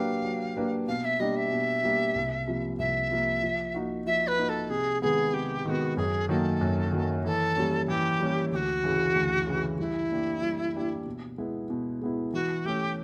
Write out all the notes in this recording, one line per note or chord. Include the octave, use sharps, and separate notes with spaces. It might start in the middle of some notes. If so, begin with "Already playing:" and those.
Already playing: F#3 A#3 D4 G4 B4 F5
F#3
A#3 D4 G4 B4
B2 F5
E5
G3 A#3 D4 G4 D#5
E5
B2
G3 A#3 D4 G4
C2
C3 F3 A#3
C2 E5
C3 F3 A#3
F3
A#3 D#4 F#4
F3 E5
B4
A#3 D#4 F#4
A4
C3 G#4
D#3 G#3 B3 G#4
C3 G4
D#3 G#3 B3 F#4 G4
F#2 G#4
D#3 F#3 A#3 A4
F#2
D#3 F#3 A#3
E3 A4
G3 A#3 C#4
E3 G4
G3 A#3 C#4
D2 F#4 G4
C#3 E3
D2
C#3 E3
G3 E4
A#3 D4 G4
G3
A#3 D4 G4
B2
G#3 B3 E4
B2
G#3 B3 E4
E3 F#4
A3 C#4 G4